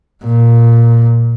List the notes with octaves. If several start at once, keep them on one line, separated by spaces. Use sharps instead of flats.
A#2